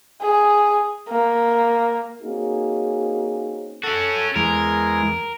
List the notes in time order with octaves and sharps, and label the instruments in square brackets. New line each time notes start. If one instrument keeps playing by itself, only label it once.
[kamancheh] G#4
A#3
[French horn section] A#3 C4 C#4 D#4 F#4 G#4
[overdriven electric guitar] C#4 F#4 [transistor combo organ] A4
[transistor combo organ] E2 G#3 [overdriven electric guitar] A#4